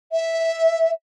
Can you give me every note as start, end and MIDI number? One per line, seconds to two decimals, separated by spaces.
0.12 0.89 76